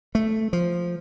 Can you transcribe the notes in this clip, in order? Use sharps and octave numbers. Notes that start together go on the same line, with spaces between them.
A3
F3